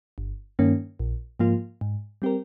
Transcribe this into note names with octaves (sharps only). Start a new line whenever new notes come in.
G1
G2 D#3 A#3 C#4
A#1
G#2 F3 A#3 F4
G#2
G3 C4 G4 A#4